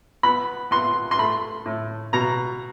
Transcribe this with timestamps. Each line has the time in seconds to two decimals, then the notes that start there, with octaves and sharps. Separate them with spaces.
0.23 B3 B5
0.71 B3 C6
1.11 C6
1.18 A3 B5
1.66 A2
2.13 B2 A#5